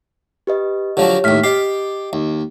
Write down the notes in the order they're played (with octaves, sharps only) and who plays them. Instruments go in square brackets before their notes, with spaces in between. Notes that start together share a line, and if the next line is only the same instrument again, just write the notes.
[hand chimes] G4 B4 D#5
[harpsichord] D3 F3 F#3 [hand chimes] G4 C#5
[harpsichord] D#2 A2 [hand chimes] F6 B6
[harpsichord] G4 [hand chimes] D#5 C7
[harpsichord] D#2